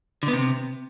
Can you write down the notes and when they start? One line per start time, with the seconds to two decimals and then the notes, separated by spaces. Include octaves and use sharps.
0.23 D3
0.28 B3
0.33 C3